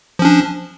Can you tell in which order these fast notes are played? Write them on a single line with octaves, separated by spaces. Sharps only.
F3 C#4 D4